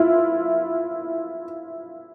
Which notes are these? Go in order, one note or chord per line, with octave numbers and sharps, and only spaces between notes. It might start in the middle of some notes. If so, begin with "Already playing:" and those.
Already playing: E4 F4